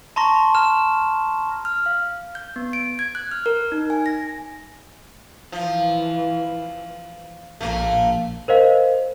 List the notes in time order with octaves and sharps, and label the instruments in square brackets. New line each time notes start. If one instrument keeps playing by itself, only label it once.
[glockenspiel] A5 A#5 C6 C#6 A#6
A#5 F6 E7
[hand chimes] F6
F5
G6
B3
D7
G#6
F#6
F6
A#4
D#4
G#5
A#6
[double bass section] E3 [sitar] F3
[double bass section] A#1 A#2 [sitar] A3 A#3
[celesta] A#4 C5 D#5 F5